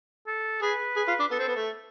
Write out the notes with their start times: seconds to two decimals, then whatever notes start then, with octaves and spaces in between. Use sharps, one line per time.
0.27 A4
0.62 G#4 B4
0.97 G#4
1.08 F4
1.20 D4
1.31 B3 A4
1.39 C4
1.48 B3
1.56 A3